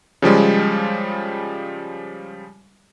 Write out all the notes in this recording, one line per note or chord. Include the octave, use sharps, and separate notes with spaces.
C#3 F3 G3 G#3